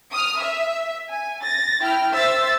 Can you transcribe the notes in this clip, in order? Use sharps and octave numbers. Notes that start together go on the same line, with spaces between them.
D#6 F6
E5
G#5
A6 A#6
E4 G5 F6
C5 E5 E6 A6